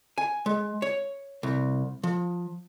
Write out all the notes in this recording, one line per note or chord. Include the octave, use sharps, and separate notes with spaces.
G#5
G#3
C#5
C2
F3